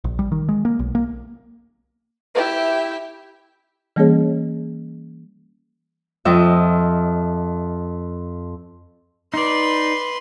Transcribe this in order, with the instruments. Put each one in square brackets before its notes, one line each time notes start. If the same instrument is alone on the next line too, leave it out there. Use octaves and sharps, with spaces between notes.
[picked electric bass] A#1
G3
D#3
G#3
A#3
B1
A#3
[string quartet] E4 G4 E5
[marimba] E3 G3 A#3 C#4 G#4 C#5
[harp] F2 D#5 E5
[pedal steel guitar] D#4 D5 [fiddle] B4 C6